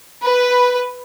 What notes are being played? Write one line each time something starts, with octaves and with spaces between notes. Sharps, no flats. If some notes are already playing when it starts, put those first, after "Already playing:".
B4